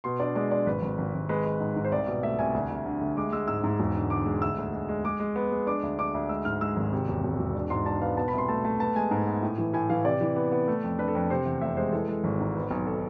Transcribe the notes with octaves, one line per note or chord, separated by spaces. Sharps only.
B2 C6
D4 D5
G#3 D5
D4 D5
G#1 B4
G#1
G#1
G#1
G#3 B4
G#3
G#2
G#2
C5
C2 D5
B2
A3 E5
C2 G#5
D2
D2
D3
D2
G#3 D6
G#3 E6
G#2 E6
G#2
E1
D3
D3 D6
G#3
D2 E6
D2
G#3
G#3
G#3 D6
G#3
B3
G#3
D4 D6
D2
D4 D6
D2
G#3 E6
G#2 F6
G#3 E6
G#1
C3
E1
E1
E1
D4
G#2 C6
D4 A5
B3 F5
B2 A5
B5
C2 C6
A3 A5
A3 A5
B3 A5
G#3 G#5
G#2
B3
A2
E3
A2 G#5
E3 F5
C3 D5
E3
B3
B3
A3
F2
D4 B4
A4
F2 B4
C3 C5
E2
F1 E5
G#3 C5
E3 A4
G#3 A4
G#1
G#2
B3
B1
A4